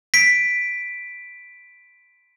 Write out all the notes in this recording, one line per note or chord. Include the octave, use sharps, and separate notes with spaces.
B6 D7